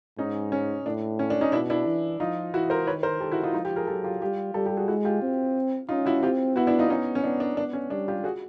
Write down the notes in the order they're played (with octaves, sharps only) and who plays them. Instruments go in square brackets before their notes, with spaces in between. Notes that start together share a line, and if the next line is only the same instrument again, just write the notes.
[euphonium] G#2 [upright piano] C#4 D#4
[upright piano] C#4
[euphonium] A2 [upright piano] D4
[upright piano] C#4
D4
C#4 D#4
[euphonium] B2 [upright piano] D4 E4
[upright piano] D4 E4
[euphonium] E3
[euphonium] F3 [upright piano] D#4 F4
[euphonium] E3 [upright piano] E4 F#4
[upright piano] A#4 C5
[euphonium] D#3 [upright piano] B4 C#5
[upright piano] A#4 C5
[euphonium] D#3 [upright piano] G4 A4
[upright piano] E4 F#4
D#4 F4
[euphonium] F3 [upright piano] D#4 F4
[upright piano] F4 G4
G#4 A#4
[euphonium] F#3 [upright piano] G4 A4
[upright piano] F4 G4
[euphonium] G3 [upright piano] F4 G4
[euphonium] G3 [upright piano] G4 A4
[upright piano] G4 A4
F#4 G#4
[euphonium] G#3 [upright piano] E4 F#4
[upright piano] F4 G4
[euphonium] C4
[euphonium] C#4 [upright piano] D#4 F4
[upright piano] E4 F#4
[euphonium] C4 [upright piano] F4 G4
[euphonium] B3 [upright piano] E4 F#4
[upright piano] D4 E4
D#4 F4
[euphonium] B3 [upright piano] C#4 D#4
[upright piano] C#4
[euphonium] B3 [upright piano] D4
[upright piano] D4
[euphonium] B3 [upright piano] D4
[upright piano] C#4
[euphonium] G3 [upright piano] D4
[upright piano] F4 G4
F#4 G#4